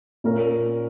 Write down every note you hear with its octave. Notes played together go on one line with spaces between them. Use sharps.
A#2 A#3 C#4 A#4